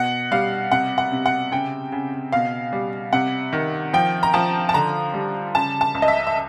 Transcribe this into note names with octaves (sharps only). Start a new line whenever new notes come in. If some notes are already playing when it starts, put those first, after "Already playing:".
Already playing: B2 F#5
G3 F5
C3 F#5
F#5
C3
F#5
C#3 G5
C#3
B2 F5
G3
C3 F#5
D#3
F3 G5
A#5
F3 A5
A5
D3 A#5
G3
C#3 A5
A5
C#2
D#5
E5
E5